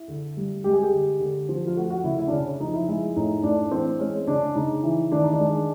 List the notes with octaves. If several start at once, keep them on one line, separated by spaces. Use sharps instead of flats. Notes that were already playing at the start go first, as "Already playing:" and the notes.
Already playing: E4
D3
G3
G#3 G4
G#4
G4
D3
D3
F3
F4
A3 F#4
F#4
C#3 E4
E4
D4
C#3 C#4
F3 D#4
E4
G#3 E4
A2 D#4
A2 D4
E3 C4
G#3 C#4
C#3 D4
C#3 D#4
E3
D#3 D4
D#4
D4
G#3